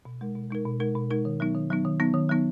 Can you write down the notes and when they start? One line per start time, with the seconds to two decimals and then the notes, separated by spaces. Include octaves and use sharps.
0.05 B2
0.21 G#3 D#4 A#4
0.35 B2
0.50 G#3 D#4 A#4
0.65 B2
0.80 G#3 D#4 A#4
0.95 B2
1.10 G#3 D#4 A#4
1.25 D#3
1.40 F#3 B3 D#4
1.55 D#3
1.70 F#3 B3 D#4
1.85 D#3
2.00 F#3 B3 D#4
2.14 D#3
2.29 F#3 B3 D#4